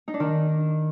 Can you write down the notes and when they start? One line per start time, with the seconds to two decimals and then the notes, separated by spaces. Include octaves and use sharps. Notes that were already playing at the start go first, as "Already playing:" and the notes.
0.08 D#4
0.14 D4
0.20 D#3